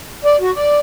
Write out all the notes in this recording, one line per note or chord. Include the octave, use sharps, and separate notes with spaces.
D5
F#4
D5